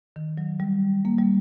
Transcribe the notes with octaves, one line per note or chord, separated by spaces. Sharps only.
D#3
F#3
G3
A#3
G3